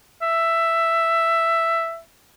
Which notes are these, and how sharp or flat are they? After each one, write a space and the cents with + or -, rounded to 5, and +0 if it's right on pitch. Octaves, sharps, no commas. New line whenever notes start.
E5 +10